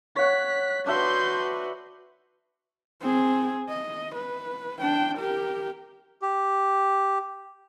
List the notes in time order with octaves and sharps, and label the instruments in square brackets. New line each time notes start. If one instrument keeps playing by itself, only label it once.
[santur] C#5 F#5 [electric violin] F#6 B6
[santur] D4 E5 [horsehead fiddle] F#4 B4 [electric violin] C6 G6
[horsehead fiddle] C4 G#4
D#5
B4
D4 G5
G4 A#4
[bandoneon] G4